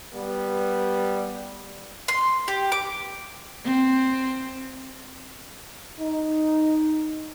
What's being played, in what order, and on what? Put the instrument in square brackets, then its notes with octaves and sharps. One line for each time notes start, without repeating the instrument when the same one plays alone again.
[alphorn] G3 [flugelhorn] B3
[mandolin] C6
G4
D6
[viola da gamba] C4
[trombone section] D#4